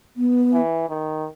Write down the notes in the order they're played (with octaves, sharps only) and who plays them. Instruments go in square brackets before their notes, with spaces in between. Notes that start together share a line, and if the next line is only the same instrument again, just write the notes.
[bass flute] B3
[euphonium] E3
D#3